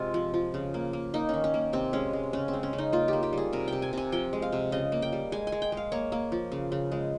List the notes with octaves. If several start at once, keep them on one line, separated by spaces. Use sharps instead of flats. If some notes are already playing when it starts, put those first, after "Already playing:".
Already playing: C3 G#3 F4
F3
F3
C#3
A#3
A#3
A#3 D#4
D#3 C#4
C#4
A#3
C3 C4
G#3 C#4
G#3
C#3 C#4
C4
G#3
C#4
C#3
D#4
A#3 F4
A#3 G4
G4
G3 G#4
C3 A#4
C3 G5
G#5
C3 G#5
F3 G5
G#3
F5
C3
C#3 D#5
A#3
G5
G3
G#3 G#5
G#5
G#3
G5
G#3
F5
A#3 C#5
A#3
F3
C#3
C#3
G#3